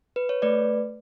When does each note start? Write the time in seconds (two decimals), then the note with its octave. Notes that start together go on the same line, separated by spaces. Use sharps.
0.16 B4
0.29 C#5
0.42 A3 B4 D5